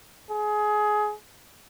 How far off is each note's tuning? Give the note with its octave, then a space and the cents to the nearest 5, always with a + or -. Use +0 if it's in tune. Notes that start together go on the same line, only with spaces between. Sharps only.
G#4 +20